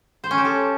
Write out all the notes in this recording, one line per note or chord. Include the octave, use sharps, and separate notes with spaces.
C5
C#4
G4
A4